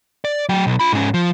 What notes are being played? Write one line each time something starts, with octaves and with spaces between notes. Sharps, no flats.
D5
F#3 G5
B1
F4 B5
G#2 C#4
F3